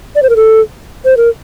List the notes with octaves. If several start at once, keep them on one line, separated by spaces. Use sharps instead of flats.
D5
C5
A#4
A4
C5
A#4